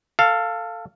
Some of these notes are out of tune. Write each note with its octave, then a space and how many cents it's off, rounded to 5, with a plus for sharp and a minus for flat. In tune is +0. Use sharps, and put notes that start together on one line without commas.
A4 +15 F5 +0